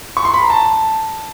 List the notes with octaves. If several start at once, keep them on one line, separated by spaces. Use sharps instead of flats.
C#6
C6
B5
A#5
A5